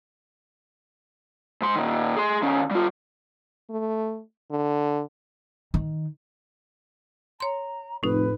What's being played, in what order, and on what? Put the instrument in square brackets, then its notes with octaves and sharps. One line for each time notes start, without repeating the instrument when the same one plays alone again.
[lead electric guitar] G#2 C6
A#2 D#3
G#4 C6
D#3 C#4
G3 F4
[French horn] A3
D3
[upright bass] D#3
[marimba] C#5 C6 [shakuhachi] A#5
[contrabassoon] F1 [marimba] A2 D#4 [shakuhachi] B4